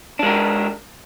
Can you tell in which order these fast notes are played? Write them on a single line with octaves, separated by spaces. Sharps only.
D4 G#3 A#4